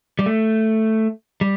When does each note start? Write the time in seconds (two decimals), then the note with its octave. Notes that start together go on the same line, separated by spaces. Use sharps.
0.19 G3
0.26 A3
1.41 G3